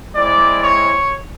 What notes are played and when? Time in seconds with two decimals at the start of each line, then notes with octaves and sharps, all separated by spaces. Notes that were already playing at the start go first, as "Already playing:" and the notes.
0.15 G#3 C4 E4 D5
0.63 C#5